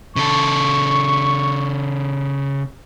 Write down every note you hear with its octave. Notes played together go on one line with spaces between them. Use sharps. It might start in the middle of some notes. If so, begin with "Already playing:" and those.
C#3 A4 C#6